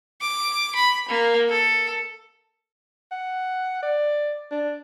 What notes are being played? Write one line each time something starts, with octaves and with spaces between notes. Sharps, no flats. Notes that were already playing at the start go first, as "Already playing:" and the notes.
D6
B5
A#3
A4
F#5
D5
D4